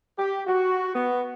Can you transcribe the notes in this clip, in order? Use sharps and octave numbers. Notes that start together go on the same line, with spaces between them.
G4
F#4
B3